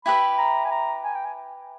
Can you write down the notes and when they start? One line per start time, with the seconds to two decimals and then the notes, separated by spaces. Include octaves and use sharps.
0.05 E4 G4 B4 E5 B5
0.38 A#5
0.65 G#5
0.71 A#5
1.04 G#5
1.15 G5
1.25 G#5